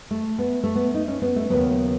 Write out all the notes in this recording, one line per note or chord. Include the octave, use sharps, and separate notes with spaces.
A3
B3
A3
B3
D#4
C#4
B3
A3
D#2 C#3 F#3 B3